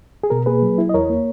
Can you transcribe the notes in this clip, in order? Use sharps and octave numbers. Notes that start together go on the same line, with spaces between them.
G#4
B2 A#4
A#3 G#4 B4
F#3
E4
D#5
E2 A#4 C#5
A#3